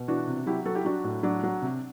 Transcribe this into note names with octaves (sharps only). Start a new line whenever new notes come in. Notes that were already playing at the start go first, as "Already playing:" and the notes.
Already playing: B2
E3 D4 F#4
C3
F#3 E4 G4
F#3 F#4 A4
E4 G4
F#3 D4 F#4
A2
F#3 D4
F#3
C3